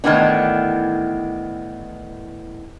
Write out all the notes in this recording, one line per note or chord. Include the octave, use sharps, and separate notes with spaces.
A2 D#3 E3 B3 D4